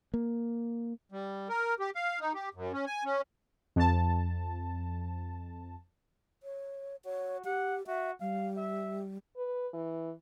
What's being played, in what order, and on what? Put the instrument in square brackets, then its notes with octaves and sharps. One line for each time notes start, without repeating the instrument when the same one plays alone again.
[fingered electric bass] A#3
[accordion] G3
A#4
G4
F5
D#4
G4
F#2
C#4
G#5
C#4
[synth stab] F2 A5
[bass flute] C#5
[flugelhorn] F#4 [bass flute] C#5
[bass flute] G4 [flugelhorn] F#5
[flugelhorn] F#4 [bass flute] E5
[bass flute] G3 [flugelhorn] F5
[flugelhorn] E5
[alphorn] B4
E3